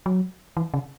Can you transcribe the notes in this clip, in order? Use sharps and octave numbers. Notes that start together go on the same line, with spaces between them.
F#3
E3
C#3